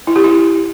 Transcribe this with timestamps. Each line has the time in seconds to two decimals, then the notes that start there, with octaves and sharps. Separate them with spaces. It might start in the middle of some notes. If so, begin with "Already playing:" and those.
0.07 E4
0.16 G4
0.24 E4